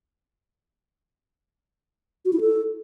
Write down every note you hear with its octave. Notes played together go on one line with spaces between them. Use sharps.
F#4
E4
A4